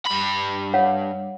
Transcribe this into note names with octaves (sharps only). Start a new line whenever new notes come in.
G2 B5
C#5 F5 F#5